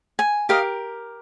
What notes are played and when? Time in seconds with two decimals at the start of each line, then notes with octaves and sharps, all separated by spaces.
0.19 G#5
0.49 G4 A#4 D#5 F5